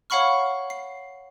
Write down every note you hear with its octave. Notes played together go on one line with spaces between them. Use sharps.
C#5 F5 F#5 B5 C#6 F6
C7